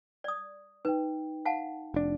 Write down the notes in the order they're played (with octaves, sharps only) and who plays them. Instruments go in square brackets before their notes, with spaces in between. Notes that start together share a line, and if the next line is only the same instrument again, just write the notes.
[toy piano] D5 D#6
[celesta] D#4 G5 [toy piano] B4
[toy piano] F5 F#5 A5
[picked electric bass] F1 D4